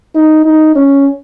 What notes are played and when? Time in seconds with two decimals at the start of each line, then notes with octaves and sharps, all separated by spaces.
0.15 D#4
0.45 D#4
0.75 C#4